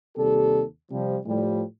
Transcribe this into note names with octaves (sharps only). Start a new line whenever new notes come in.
D#2 C3 G3 G4 A4
C3 F3 G3
A2 F3 G3